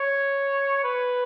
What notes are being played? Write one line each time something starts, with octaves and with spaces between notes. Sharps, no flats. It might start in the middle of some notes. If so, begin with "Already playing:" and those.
Already playing: C#5
B4